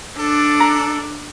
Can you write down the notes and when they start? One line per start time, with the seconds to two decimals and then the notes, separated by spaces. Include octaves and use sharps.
0.19 D4 A4
0.60 A#5